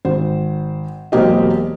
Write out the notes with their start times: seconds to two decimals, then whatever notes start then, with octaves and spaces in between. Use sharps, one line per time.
0.05 G#1 C5
1.12 E1 F#3 A#3 C4 G4 D#5